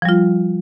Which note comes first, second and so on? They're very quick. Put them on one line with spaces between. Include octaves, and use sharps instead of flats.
F3 G3 F4